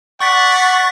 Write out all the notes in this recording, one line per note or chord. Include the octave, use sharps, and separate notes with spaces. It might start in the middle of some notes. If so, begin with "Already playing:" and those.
D5 F#5 C#6 A6 B6